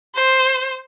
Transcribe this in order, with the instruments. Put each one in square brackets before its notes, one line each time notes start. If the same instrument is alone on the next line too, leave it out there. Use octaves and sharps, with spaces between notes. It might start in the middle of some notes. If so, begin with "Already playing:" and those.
[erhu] C5